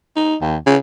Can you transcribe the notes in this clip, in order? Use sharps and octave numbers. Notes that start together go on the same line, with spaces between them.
D#4
D#2
C#3